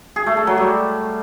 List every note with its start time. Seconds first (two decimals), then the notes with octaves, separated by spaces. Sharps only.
0.16 G#4
0.26 A3
0.37 A4
0.47 F#3
0.57 G3